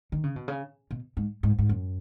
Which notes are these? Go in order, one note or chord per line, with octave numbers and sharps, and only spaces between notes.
D#3
C#3
B2
C#3
B2
G#2
G#2
G#2
F#2